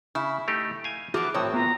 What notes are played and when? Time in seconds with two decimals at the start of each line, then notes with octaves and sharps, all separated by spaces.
0.15 C#3 E4
0.48 A3 D#4 G4
0.84 F5 G#5
1.14 E3 F3 B3 F#4 G#4 D6
1.35 G#1 A2 F#3 C4 C#5 D#6
1.54 B3 F4 A#5